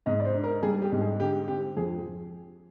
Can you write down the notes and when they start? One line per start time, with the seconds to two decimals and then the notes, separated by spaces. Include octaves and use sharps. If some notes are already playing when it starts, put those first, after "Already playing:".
0.06 G#2 D#5
0.20 D5
0.25 C5
0.34 D4
0.44 A#4
0.63 G3 G#4
0.82 G4
0.92 G#2
1.01 G#4
1.20 D3 G4
1.48 C4 G4
1.77 F2 G#4